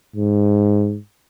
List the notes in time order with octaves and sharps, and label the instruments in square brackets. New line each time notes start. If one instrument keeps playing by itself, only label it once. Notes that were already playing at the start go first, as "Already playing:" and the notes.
[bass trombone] G#2